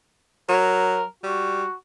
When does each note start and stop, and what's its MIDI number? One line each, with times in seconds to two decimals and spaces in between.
0.49 1.03 54
0.49 1.04 70
1.23 1.64 55
1.23 1.72 66